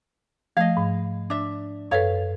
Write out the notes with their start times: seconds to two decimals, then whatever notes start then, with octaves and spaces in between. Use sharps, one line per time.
0.57 F3 A3 D#5 F5
0.77 G#2
1.30 D4 E5
1.91 F#2 A4 B4 C#5 F5